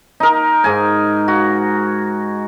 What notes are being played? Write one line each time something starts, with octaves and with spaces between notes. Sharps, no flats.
D#4 A#4
G#2 G#5
F#4